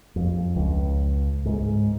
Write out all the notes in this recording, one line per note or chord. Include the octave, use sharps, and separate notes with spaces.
F2
C#2
G#2